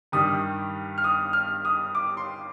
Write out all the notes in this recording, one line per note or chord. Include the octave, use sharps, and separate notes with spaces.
G2 D#3 G3 D#6
F6
D#6
F6
D#6
D6
C6